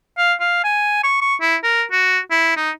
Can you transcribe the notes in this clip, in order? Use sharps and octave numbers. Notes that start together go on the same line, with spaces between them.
F5
F5
G#5
C#6
C#6
E4
A#4
F#4
E4
D#4